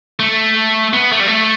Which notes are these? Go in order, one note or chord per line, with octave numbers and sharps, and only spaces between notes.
A3
B3
A3
G3
A3